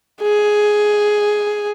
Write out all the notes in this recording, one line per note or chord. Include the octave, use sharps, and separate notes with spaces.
G#4